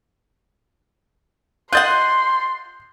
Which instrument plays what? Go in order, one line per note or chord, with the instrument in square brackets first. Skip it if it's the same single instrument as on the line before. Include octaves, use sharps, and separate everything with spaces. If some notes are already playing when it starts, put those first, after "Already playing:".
[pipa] F4 D#5 F#5 [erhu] C6 [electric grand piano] F#6 G6 A6